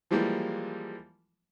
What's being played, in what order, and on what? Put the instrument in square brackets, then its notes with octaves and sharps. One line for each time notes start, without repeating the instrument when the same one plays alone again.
[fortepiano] E3 F3 G3 G#3 A#3